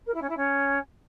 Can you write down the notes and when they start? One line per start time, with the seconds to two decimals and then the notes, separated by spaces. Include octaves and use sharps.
0.06 A#4
0.14 E4
0.22 C#4
0.29 E4
0.37 C#4